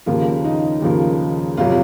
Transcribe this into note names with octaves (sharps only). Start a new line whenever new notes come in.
D#2 C#3 F3 A#3 F4
D#4
D#2 C#3 F3 A#3
F1 C3 F#3 F4